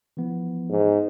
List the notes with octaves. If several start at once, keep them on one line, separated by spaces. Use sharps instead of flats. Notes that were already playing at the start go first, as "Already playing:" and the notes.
E3 F3 B3
G#2